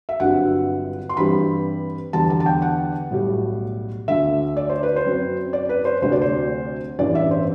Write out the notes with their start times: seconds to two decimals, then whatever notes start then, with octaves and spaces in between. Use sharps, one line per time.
0.09 E5
0.20 G1 G2 F#3 C4 F#5
1.09 C6
1.16 G2 E3 G3 C4 B5
2.13 E2 D3 G3 B3 A5
2.30 A5
2.40 A5
2.46 G5
2.62 F#5
3.10 B1 A2 G3
4.08 D2 D3 A3 E5
4.57 D5
4.70 C5
4.83 B4
4.96 C5
5.05 F#2 F#3 C4
5.53 D5
5.69 B4
5.85 C5
6.02 D2 C3 F#3 A3 C5
6.12 D5
6.22 C5
6.99 A1 G2 E3 B3 D5
7.15 E5
7.31 C5